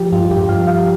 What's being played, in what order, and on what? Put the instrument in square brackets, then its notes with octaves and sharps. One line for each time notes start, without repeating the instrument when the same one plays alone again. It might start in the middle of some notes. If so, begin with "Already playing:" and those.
Already playing: [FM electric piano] F3 G4
G2 F4
G2 G4
F3 F5
F3 F5